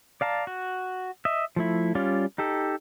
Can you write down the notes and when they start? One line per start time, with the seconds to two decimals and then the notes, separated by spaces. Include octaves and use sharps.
0.21 D5 F5 A5 A#5
0.47 F#4
1.25 D#5 E5
1.56 F3 A3 E4
1.95 G3 C#4 F4 D5
2.38 D#4 G4 A4